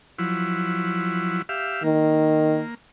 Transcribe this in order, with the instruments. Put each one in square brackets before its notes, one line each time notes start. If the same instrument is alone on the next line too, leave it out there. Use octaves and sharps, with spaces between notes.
[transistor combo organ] F3 F#3 E4
G4 E5 F5
[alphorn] D#3 [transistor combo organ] A#3